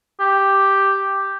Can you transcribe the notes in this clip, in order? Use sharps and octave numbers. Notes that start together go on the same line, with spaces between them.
G4